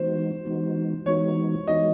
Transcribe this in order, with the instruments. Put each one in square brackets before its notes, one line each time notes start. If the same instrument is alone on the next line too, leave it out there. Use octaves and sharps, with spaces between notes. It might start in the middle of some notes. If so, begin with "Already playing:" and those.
Already playing: [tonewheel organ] E3 G#3 B3 D#4 F#4 [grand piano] C5
[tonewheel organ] E3 G#3 B3 D#4 F#4
[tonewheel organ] E3 G#3 B3 D#4 F#4 [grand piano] C#5
[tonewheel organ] E3 G#3 B3 D#4 F#4 [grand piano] D#5